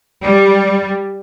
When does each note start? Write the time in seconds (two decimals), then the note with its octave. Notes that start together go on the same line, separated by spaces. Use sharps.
0.23 G3